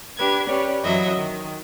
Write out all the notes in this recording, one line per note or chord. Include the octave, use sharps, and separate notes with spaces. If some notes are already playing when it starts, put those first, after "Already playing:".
D4 G4 B4 G#6
C#4 G4 B4 C#5 D5
F#2 E3 F#3 D#5 E5
D#3